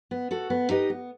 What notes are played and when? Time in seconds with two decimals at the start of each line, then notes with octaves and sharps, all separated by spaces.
0.11 B3
0.31 F#4 A4
0.50 B3
0.69 D#4 G4 B4 D#5
0.90 B3